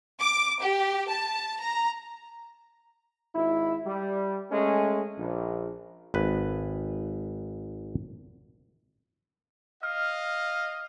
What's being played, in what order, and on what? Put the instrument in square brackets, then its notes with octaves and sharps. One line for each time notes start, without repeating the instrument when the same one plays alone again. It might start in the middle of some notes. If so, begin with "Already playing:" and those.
[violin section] D6
G4
A5
A#5
[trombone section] G#1 E4
G3
G#3 A3 C#4
A#1
[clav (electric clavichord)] G#1 B4
[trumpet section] D#5 F5 [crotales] F6